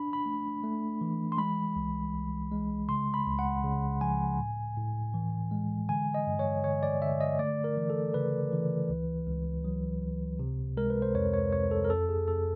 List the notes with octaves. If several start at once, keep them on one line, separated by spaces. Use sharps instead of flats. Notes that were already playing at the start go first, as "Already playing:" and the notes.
Already playing: D4 B5
B5
A3
A3
E3
C6
G#3 B5
C2
C2
G#3
C#3 C6
B5
C#2
F#5
C#3
F3 G#5
A2
A2
E3
G#3
D3 G#5
D#5
G2
C#5
D3 C#5
D5
D3 E5
D#5
A3 D5
A#4
E3
A4
C#3 B4
E3
C#2
C#2
F#3
C#2
C3
G#3 A#4
B4
C5
F2 C#5
C#5
F2 C#5
A4
A#4
F2 A4
G#4
F2 A4